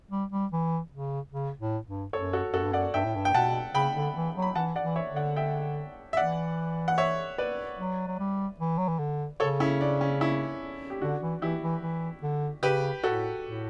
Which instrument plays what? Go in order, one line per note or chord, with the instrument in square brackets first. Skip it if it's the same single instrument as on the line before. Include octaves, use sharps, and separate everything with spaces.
[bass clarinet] G3
G3
E3
C#3
C#3
A2
G2
[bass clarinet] F#2 [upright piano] A4 C#5
[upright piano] F#4 A4
[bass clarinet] F#2 [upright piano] F#4 A4
[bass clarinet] G2
[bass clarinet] F#2 [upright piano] D5 F#5
[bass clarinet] G2 [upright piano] E5 G5
[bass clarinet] A2
G2
[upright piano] G5
[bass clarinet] B2 [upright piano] F#5 A5
[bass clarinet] C#3 [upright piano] G5 B5
[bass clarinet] D3
E3
F#3
[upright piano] B5
[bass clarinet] E3 [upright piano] F#5 A5
[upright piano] D5 F#5
[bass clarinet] E3
[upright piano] C#5 E5
[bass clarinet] D3
[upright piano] D5 F#5
E5 G5
E5
[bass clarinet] E3 [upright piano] D5 F#5
[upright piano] F#5
C#5 E5
B4 D5
[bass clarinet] F#3
F#3
G3
E3
F#3
E3
D3
[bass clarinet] C#3 [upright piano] A4 C#5
[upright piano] C#4 E4
D4
C#4
C#4 E4
G4
[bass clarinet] D3 [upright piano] D4 F#4
[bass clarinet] E3
[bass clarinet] E3 [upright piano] E4 G4
[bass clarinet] E3
E3
D3
[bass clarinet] C#3 [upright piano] G4 B4
[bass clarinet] A2 [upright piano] F#4 A4
[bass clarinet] A2